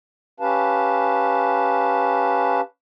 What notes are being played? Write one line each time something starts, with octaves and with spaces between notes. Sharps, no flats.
C#4 G4 B4 F5 A5